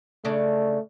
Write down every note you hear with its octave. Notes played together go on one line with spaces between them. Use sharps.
C#3 A3 D4